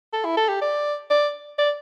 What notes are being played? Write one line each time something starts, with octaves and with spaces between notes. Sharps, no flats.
A4
E4
A4
G4
D5
D5
D5